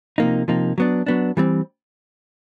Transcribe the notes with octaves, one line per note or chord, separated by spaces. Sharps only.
C3 F3 A#3 D#4
C3 F3 A#3 D#4
F#3 B3 D4
F#3 B3 D4
E3 G3 C4